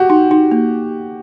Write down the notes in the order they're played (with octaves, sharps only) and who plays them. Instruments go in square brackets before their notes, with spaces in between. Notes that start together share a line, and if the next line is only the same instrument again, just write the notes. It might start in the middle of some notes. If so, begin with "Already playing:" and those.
Already playing: [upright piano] F#4 G4
[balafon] D#4
D#4
A#3